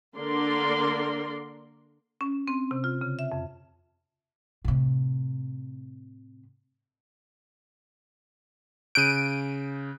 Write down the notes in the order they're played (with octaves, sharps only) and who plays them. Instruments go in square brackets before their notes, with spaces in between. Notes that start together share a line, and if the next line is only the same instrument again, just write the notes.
[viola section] D3 A#3 A#4 D5 C6
[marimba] C#4
C4
C3
F4
C#3
E5
F2
[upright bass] A2 C3
[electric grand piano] C#3 F#6 G6 [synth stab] D7 D#7